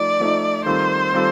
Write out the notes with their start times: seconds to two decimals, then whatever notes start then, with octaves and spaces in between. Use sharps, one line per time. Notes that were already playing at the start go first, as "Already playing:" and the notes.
Already playing: F3 A3 D#4 D5
0.19 F3 A3 D#4
0.66 D#3 G3 C4 F4 A4 C5
1.13 D#3 G3 C4 F4 A4